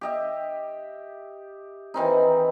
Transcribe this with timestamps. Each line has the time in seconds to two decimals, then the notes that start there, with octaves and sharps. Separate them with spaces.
0.01 G4 D#5 E5
1.94 D#3 E3 C4 D#4